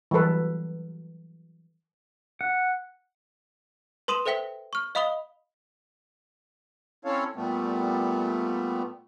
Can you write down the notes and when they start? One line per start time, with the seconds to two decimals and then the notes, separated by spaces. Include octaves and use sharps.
0.11 E3 F#3 G3 A4 B4
2.41 F#5
4.08 B4 C6 D#6 D#7 E7 F#7
4.26 A4 C5 E5 G5 B6 G7
4.73 C#6 F6
4.95 D#5 F5 B5 D#6 F7 G7
7.05 C4 C#4 E4 A4 C#5 F5
7.36 A#2 G3 A3 B3